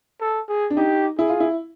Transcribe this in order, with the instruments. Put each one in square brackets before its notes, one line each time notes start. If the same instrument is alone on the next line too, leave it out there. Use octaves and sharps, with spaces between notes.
[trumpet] A4
G#4
[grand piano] D4
[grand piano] D#4 [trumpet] G4
[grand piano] E4 [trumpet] G#4
[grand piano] F4
E4